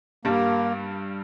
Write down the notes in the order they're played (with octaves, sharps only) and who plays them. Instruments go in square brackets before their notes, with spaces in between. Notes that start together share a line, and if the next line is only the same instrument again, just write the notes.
[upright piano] G2 G3 [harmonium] A#3